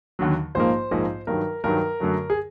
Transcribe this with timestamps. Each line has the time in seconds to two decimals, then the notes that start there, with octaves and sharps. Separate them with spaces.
0.19 D#2 D3 F#3
0.55 A#1 G#2 F3 A#3 C5
0.91 A#1 G#2 F3 A#3
1.27 G2 D#3 F#3 A#4
1.64 G2 D#3 F#3 A#4
2.00 F#2 D3 F#3 A3
2.30 G#4